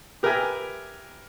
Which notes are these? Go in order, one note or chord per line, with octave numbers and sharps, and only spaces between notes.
G4 A#4 B4 E5 G#5